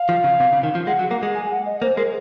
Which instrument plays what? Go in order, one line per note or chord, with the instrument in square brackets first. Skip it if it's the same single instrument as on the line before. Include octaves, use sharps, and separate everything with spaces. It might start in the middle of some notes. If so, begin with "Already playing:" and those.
Already playing: [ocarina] F5
[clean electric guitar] F3
C#3
C3
C#3
D#3
F3
[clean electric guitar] G#3 [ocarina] F#5
[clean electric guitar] F#3
A#3
G#3
[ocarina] G#5
F#5
D#5
[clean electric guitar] A#3 [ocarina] C5
[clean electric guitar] G#3 [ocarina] A#4